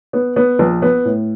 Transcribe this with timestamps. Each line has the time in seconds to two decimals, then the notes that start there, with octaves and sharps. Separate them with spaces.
0.13 B3
0.36 B3
0.59 A#1
0.82 B3
1.05 A2